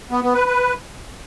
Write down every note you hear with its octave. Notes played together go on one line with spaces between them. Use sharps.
B3
B3
B4
B4